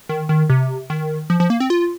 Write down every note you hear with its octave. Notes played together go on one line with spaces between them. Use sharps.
D#3
D#3
C3
D#3
F3
F3
A#3
C4
F4